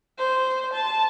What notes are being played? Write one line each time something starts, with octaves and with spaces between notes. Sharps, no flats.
C5
A5